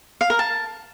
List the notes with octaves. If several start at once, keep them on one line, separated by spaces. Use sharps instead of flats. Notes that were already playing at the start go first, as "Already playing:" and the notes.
F5
A#4
A5